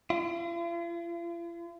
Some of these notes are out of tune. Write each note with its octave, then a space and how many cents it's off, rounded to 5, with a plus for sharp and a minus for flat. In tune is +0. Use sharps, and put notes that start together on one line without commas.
F4 -45